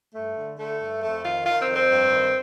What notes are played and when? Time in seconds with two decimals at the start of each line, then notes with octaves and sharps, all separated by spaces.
0.14 G2 A3
0.37 D3
0.57 D3 A3
0.80 G2
1.02 F2 A3
1.23 D#3 F4
1.45 D#3 F4
1.60 C4
1.67 F2
1.75 C4
1.89 G2
2.11 D#3